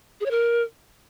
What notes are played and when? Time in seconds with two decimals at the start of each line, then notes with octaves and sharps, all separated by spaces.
0.20 G#4
0.25 C#5
0.31 A#4